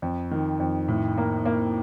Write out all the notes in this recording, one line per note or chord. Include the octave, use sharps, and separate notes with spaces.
F2
D#3
F2
A2
A#3
A#3